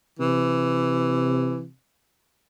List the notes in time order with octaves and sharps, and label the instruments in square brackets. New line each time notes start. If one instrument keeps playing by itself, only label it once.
[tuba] C3 [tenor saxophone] E3